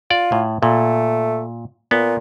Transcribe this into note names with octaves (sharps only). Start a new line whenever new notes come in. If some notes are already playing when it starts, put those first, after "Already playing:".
F4 D5
A2
A#2 A3
A#2 B3